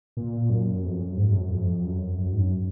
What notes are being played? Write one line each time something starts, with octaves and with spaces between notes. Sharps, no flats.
A#2
F#2
F2
F#2
G#2
G#2
F#2
F2
F#2
F#2
G#2
F#2